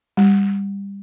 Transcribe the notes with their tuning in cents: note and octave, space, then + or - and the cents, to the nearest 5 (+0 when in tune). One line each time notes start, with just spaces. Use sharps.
G3 +20